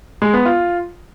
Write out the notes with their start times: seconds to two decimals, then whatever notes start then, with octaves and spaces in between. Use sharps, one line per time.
0.22 G#3
0.34 B3
0.46 F4